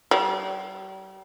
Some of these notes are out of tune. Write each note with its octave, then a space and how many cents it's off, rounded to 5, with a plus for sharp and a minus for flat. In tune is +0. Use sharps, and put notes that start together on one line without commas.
G3 -40